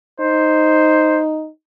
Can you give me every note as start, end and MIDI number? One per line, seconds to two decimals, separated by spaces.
0.20 1.48 63
0.20 1.22 72